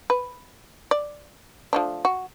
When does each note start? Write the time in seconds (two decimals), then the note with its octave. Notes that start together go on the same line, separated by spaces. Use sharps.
0.10 B4
0.91 D5
1.73 F3 A3 D4
2.05 F#4